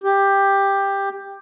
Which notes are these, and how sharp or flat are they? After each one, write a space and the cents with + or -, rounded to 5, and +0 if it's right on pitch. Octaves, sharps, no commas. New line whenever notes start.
G4 +10